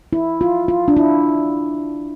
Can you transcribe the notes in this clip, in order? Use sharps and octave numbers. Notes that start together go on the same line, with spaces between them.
E4
F4
F4
D4
E4